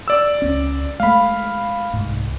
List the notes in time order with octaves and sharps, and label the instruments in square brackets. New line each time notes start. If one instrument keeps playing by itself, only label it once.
[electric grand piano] D5 E6
[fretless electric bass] C#2 C#4
[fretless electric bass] G#3 A3 [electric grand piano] F5 B5
[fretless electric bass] C2 G#2